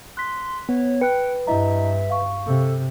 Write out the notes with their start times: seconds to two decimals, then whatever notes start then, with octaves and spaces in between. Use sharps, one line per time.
0.17 C6 F#6 B6
0.69 B3 C#5
1.01 B4 G5 F#6 C#7
1.47 G2 E4 D#5 E5 A#5
2.10 F5 C#6
2.47 C3 A4